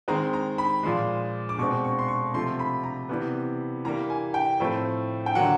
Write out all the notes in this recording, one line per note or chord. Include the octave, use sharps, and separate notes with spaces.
D#3 G#3 C4 A#5
A#5
B5
A#2 F3 G#3 C6
D6
B2 G#3 C4 C#6
C#6
C6
C#6
C3 F3 A3 C6
B5
A#5
C3 E3 G3 B3
E3 G3 A#3 A#5
G#5
G5
A2 F3 A3 C4
G5
D3 F#3 A#3 F#5